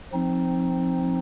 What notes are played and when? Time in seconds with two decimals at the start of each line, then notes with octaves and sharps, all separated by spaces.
0.12 F3 C4 D#4